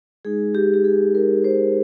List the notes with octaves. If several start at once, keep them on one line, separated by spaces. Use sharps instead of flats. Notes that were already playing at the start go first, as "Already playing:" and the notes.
G#3 D#4 G#4
G4
G4
G#4
G#3 D#4 A#4
C5